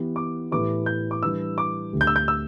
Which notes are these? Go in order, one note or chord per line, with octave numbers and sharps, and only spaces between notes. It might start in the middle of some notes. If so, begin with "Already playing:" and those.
Already playing: E3 B3 G4
D6
A2 E3 A3 G4 B4 D6
G6
D6
E3 G3 D4 B4 E6
D6
D2 D3 A3 G4
G6
E6
G6
E6